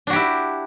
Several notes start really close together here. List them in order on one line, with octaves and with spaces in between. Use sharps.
D4 F#4 G4 E4